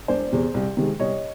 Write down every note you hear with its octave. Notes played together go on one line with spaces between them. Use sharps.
E1 C5 D5
E2 C3
C2
C3 D#3 G#3
C2 C#5 D#5